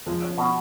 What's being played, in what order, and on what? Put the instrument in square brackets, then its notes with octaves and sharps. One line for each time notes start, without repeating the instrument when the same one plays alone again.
[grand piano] F3 [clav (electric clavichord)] G#3
[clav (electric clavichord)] C#4
B2